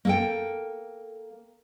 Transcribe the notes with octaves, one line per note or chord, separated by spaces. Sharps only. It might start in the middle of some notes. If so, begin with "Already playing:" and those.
A#3 A4 G5